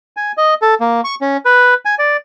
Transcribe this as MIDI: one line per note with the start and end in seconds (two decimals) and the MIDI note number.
0.17 0.32 80
0.37 0.54 75
0.62 0.75 69
0.81 1.01 58
1.04 1.15 85
1.21 1.37 61
1.45 1.74 71
1.85 1.95 80
1.99 2.17 74